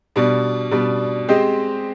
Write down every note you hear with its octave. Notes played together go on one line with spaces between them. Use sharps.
B2 G3 D4
B2 G3 D4
G#3 C4 G4 C5 D#5